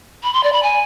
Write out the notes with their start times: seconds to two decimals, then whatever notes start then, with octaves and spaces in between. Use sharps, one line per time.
0.23 B5
0.33 C6
0.44 D5
0.53 B5
0.63 G#5